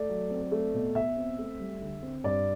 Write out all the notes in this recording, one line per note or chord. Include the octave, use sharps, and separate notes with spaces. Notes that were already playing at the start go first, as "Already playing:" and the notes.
Already playing: A3 D5
F#3
C4
A3
B2
B2 E5
C4
A3
G3
D3
C4
G2 D5